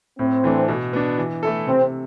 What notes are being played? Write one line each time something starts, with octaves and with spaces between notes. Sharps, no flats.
A2 C4
E3 A3 D4
B2
B3 D4
E3
A3 E4 A4
C3 C4